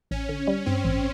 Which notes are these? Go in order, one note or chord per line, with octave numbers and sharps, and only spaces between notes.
A1 C#4
D3
G3
G2 C4
A1